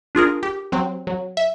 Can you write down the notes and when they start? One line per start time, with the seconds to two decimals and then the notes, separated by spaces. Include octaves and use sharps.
0.15 D4 F4 G#4 A#4
0.43 G4
0.72 F#3 C4
1.07 F#3
1.37 E5